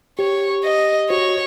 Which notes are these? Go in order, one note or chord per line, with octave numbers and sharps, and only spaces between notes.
G4 C#5
D#5
F#4 C#5